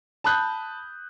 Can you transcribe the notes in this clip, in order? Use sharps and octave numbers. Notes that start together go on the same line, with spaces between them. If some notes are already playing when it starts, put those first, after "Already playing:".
A5 B5 D#6 F#6 G6